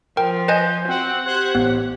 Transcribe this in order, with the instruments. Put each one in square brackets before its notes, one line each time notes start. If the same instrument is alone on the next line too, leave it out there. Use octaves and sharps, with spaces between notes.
[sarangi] F3 [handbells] A#4 G5
[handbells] B4 D#5 G#5 [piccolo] G6
[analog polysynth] C4 [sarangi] F#4 [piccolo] F#5
[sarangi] G4 [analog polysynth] C5 F#6 G#6
[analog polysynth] A1 [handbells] B3